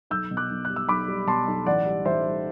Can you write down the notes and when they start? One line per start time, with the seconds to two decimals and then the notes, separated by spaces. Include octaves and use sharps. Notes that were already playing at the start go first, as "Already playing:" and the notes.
0.10 B1 E6 G6
0.31 B2
0.37 D6 F#6
0.50 B1
0.65 F#6
0.70 G3
0.76 E6
0.89 B1 B5 D6
1.08 G3
1.27 B2 A5 C6
1.48 B1
1.66 A1 D5 F#5
1.86 G3
2.05 A1 C5 E5
2.25 G3